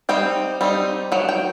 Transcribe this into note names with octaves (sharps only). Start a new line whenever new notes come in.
G3 C4 D#4 G5
G3 C4 D#4
D#3 F#3
G5